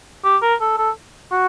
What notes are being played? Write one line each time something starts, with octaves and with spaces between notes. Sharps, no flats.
G4
A#4
A4
A4
F#4